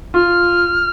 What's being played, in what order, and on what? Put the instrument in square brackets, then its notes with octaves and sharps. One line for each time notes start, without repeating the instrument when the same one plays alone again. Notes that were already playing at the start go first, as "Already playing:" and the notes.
[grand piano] F4 [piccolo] F6